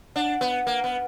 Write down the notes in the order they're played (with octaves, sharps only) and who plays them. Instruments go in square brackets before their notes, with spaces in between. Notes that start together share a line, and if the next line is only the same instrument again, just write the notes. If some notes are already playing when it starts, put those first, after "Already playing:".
[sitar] D4 [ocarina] F#5
[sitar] B3
A#3
B3